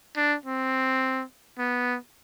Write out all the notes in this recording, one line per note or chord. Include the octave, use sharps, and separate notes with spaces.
D4
C4
B3